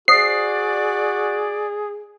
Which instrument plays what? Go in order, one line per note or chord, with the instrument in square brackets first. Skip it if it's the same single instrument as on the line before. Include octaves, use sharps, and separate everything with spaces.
[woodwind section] F#4 D5 [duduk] G#4 [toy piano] C5 E5 D#6 [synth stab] C7